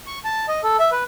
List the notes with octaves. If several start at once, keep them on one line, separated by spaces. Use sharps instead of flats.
C#6
A5
D#5
A4
E5
B4